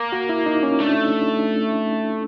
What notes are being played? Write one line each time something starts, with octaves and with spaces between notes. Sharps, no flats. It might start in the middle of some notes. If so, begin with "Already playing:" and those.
Already playing: A#3
F#4
E4
D#4
C#4
A3 D4